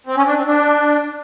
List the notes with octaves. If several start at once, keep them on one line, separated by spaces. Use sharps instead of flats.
C4
C#4
D4
C4
D4